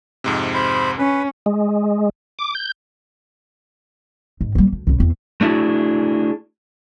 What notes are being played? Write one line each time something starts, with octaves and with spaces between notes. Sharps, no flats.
F2 G#2 C3
C5 B5
C#4 B4
G#3
D6
G6
G#2
G3 A#3
D2
C2 C#3
E2 C4
A3 D4 E4 F#4 G#4